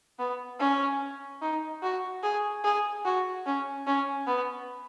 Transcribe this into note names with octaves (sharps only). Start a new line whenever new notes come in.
B3
C#4
D#4
F#4
G#4
G#4
F#4
C#4
C#4
B3